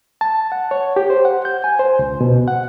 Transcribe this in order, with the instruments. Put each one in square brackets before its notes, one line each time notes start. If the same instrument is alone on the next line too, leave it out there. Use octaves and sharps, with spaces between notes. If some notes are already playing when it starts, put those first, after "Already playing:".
[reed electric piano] A5
F#5
C#5
G4
C5
F#5
G6
G#5
C5
C#2
B2
F#5